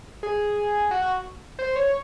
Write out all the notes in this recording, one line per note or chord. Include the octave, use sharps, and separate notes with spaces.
G#4
F#4
F#4
C5
C#5